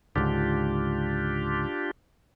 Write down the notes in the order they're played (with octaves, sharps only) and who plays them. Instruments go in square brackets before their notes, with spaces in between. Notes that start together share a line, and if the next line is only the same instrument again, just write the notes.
[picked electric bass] C#2 G#2 D3 [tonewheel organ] D4 F4 G4